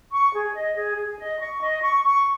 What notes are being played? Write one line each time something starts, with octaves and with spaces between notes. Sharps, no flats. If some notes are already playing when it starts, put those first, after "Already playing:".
C#6
G#4
D#5
G#4
G#4
D#5
C#6
D#5
C#6
C#6